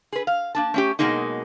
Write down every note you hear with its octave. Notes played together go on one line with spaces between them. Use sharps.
G#4 B4
F5
A#3 D4 A5
A3 C#4 G4
B2 E3 F#3 G#3 A#3 D#4